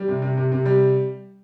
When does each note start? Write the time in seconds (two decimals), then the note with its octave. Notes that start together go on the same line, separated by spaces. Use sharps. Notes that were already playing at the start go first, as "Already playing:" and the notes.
Already playing: G3
0.08 C3
0.22 C3
0.37 C3
0.52 C3
0.65 G3